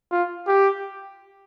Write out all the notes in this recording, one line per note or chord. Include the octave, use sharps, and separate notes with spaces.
F4
G4